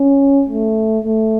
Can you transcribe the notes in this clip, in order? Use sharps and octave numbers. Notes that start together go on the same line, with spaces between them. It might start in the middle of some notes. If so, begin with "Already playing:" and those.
Already playing: C#4
A3
A3